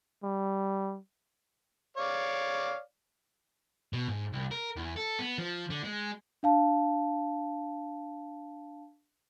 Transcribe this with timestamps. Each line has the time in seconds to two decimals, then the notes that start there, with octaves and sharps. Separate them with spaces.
0.23 G3
1.97 C#5 D5 F5
3.93 B2
4.08 G#2
4.33 C2
4.51 A#4
4.76 E2
4.96 A4
5.19 B3
5.38 F3
5.70 D3
5.84 G#3
6.43 D4 F5 A5